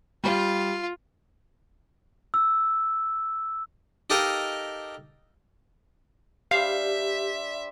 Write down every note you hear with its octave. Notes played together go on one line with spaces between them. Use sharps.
G3 F4
E6
D#4 G4 A4 A#4 D#5 F5
G3 D4 G4 C5 E5 F5